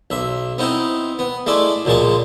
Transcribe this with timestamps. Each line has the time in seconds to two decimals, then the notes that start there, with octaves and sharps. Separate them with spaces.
0.10 B1 E5
0.58 B3 C4 D#4 E4
1.19 B3
1.46 G#3 A3 E4 D5
1.85 C#2 A#2 F3 G#3 A5